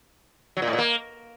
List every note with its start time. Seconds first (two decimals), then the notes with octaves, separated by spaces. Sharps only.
0.57 F#3
0.62 A#2
0.68 A2
0.73 A#2
0.78 A#3